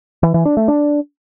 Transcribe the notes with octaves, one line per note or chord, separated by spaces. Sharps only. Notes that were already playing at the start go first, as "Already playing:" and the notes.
E3
E3
D4
A3
D4